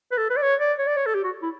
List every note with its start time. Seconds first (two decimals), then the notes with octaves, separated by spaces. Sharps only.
0.12 B4
0.18 A4
0.30 B4
0.37 D5
0.42 C#5
0.60 D5
0.79 C#5
0.87 D5
0.97 C#5
1.06 A4
1.15 G4
1.24 F#4
1.42 E4